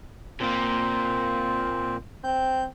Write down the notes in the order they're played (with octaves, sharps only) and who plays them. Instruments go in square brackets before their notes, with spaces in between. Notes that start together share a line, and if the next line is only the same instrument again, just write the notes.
[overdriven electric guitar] A#2 A#3 [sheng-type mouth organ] C4
[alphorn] C4 [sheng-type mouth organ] G6